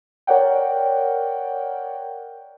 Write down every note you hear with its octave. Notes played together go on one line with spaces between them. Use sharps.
A#4 C#5 D5 F#5 G5